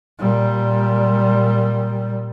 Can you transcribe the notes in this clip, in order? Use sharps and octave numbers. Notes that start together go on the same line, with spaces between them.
A#2 G3